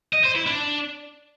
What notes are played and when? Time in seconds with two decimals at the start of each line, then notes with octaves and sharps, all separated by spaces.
0.13 D#5
0.24 C5
0.35 E4
0.46 D4